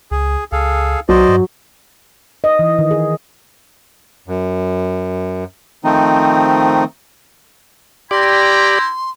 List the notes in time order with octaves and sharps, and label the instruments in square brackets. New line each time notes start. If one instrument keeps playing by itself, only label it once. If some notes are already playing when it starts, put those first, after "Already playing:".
[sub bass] C#2 [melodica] G#4
[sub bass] C#2 [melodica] G#4 A4 F5
[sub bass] B1 [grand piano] F#3 [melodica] C5 D5 D#5
[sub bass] G2
[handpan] D#5
E3
D#3
G#4
[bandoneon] F#2
D#3 F3 A3 C4 D#4
[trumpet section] E4 G5 A#5 [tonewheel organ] G4 D5 [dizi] C6